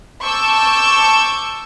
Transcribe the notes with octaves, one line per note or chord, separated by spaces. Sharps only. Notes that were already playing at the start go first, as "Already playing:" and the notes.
A5 C#6 D6 E6 G6